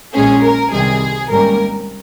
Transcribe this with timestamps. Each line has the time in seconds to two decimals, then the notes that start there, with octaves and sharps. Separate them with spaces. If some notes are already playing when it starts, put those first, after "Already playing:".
0.13 A#1 A#2 G#3 C#4 G#4
0.42 A#4
0.71 C2 C3 D#3 G3 G#4
1.29 G#1 G#2 G3 A#3 C#4 A#4